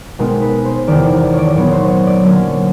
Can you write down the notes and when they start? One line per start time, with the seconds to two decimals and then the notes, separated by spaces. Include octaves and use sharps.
0.19 B2 G#3 C4 D#4 A#4
0.42 B4
0.65 C5
0.87 E2 C3 D#3 D5
1.05 D5
1.22 D5
1.33 C#5
1.39 D5
1.50 D5
1.55 A#2 F#3 B3 D#4 C#5
1.72 C5
1.90 C#5
2.07 D5
2.23 D3 F#3 A#3 C#4